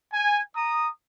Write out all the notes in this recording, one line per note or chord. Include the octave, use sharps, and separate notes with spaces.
G#5
A#5 D#6